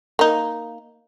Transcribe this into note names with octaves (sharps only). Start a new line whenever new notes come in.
A#3 D#4